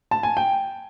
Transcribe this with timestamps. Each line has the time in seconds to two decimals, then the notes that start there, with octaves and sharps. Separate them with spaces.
0.11 A5
0.23 G#5
0.37 G5